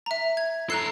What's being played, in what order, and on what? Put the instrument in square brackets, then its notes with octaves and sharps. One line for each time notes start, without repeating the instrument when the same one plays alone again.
[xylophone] E5 A#5
G#6
[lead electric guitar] A4 A#5 [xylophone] F#6 C7